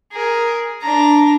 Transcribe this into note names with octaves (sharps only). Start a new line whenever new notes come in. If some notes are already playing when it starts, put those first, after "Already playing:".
G#4 A#4
D4 A#5